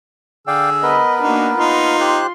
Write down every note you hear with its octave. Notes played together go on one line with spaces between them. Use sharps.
D3 G#4 D5 F5 G5 E6
B3 A#4 B4 D#5 B5
A#3 D4 D#4 F#4
A#3 D#4 F4 C6
G4 C5 F#6